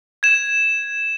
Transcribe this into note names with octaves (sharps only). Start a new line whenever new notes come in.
G#6 E7